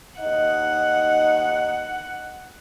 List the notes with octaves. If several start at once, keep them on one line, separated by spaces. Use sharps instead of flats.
D#2 D#4 D#5 F#5